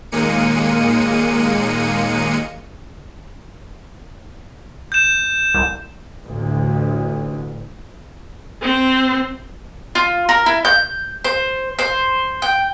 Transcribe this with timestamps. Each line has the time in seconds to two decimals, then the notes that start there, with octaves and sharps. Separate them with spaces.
0.12 D#2 A#2 G#3 A#3 C#7 D#7
4.92 G6 E7
5.54 C2
6.23 A1 D2
8.62 C4
9.95 F4
10.29 A#4
10.46 E4
10.65 G6
11.24 C5
11.79 C5
12.42 G5